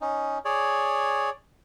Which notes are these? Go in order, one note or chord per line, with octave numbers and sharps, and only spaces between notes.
C#4 D#4
G#4 C#5 D5